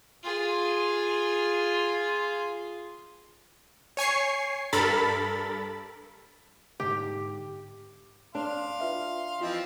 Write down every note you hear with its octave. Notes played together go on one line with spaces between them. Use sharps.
F4 G#4
C#5 G#5 C#6 C7
G2 A4 A#4 B5 A6
G#2 D3 G4
D4 F5 C6
F4 B4 E5
E3 F3 C4 F4 D#5